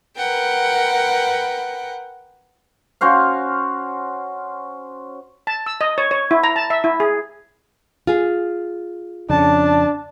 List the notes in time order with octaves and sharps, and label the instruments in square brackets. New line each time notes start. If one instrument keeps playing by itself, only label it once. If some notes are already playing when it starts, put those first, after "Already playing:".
[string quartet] A#4 B4 F#5 G5
[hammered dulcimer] C#4 F#4 C5 F5
[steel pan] A5
E6
D#5
C#5
C#5
E4
A#5
A5
E5
E4
G#4
[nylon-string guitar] F4 G#4
[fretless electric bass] F2 C#3 [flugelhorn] D4 [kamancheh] A5